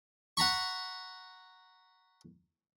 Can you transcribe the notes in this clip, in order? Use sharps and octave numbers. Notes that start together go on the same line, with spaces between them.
F#5 A#5 B5 C#6